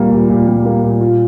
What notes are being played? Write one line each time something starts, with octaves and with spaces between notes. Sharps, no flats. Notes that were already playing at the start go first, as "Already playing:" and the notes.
Already playing: A#2 G3 A#3
A#2
A#2
G3
A#3
A#2
F4